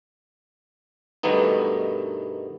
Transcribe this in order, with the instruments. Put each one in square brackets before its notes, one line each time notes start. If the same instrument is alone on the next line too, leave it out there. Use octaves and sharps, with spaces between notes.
[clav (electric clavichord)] G2 B2 D#3 A3 B3 D#4